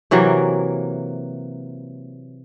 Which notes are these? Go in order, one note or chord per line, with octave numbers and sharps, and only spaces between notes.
C3 E3 F#3 A#3